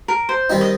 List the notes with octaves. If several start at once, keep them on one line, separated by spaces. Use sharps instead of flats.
A#4
C5
D#3 G3 C4 D#4
D#5